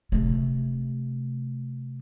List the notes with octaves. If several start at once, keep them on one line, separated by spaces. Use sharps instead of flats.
C3 A3